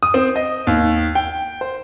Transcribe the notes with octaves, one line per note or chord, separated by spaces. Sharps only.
D#6
C4
D#5
D#2
G5
C5